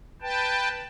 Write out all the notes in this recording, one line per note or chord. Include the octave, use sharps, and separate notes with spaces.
B4 G5 A5